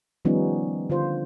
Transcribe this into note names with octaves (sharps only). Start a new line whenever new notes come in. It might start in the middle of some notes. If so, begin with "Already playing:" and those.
D#3 F3 G3 B3 C#4 D#4
D3 F4 C5